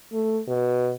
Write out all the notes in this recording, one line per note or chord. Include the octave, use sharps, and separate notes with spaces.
A3
B2